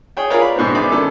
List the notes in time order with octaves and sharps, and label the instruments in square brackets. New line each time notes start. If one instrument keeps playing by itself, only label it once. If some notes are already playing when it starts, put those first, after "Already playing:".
[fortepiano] G#4 C#5 G5
F4 G#4 A#4 B4 C#5 D5
B5
G#2 B2 D3 B3 C4
E2 D5 B5 D6
D#3 C#4 A4